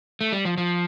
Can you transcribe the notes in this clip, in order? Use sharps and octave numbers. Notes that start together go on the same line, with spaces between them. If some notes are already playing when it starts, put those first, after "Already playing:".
A3
G3
F3
F3